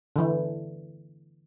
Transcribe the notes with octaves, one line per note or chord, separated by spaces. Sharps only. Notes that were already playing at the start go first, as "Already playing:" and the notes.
D3 E3